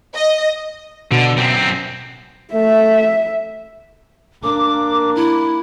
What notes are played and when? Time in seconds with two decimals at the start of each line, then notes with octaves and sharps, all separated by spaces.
0.15 D#5
1.12 B2 D3
1.37 F#2 C4
2.54 A3 E5
4.43 A#3 D4 D6
5.15 E4